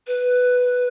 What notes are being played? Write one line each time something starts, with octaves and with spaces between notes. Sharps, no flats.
B4